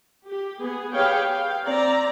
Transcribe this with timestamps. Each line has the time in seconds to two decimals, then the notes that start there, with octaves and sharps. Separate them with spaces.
0.25 G4
0.59 B3 G#4
0.93 G4 G#4 B4 C#5 F5 G5
1.31 F5 G5
1.66 C4 D5 A#5